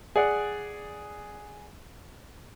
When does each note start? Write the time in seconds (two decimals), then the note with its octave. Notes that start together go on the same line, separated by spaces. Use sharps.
0.16 G#4 D5 F#5